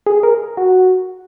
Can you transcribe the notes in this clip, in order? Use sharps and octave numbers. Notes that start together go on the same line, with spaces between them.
G#4
A#4
F#4